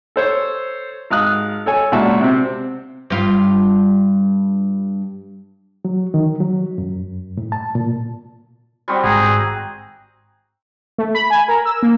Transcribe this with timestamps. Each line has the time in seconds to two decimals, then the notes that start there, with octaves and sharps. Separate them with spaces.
0.16 A4 C5 C#5
1.10 G#1 F5 D#6 F#6
1.66 A4 C#5 G#5
1.92 C#2 A#2 D4 F#4 E5 A5
2.21 C3 C4
3.10 G2 F4
5.85 F#3
6.14 D#3
6.40 F#3
6.78 F#2
7.37 A2
7.52 A5
7.75 A#2
8.88 G3 C4 F#4 G4 D5 D#6
9.04 G#1 G#2 G#4 F#5 G5 A#5 D6
10.98 A3
11.15 B5
11.30 G#5
11.48 A#4
11.65 E6
11.83 A#3